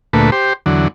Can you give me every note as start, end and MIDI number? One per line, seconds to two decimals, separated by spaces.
0.13 0.30 38
0.13 0.30 46
0.13 0.30 57
0.13 0.30 71
0.32 0.53 67
0.32 0.53 72
0.66 0.88 40
0.66 0.88 50
0.66 0.88 54